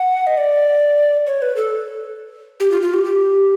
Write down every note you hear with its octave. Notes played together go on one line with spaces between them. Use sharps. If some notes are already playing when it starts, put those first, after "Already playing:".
Already playing: F#5
D#5
D5
C#5
B4
A4
G4
F4
F4
G4
G4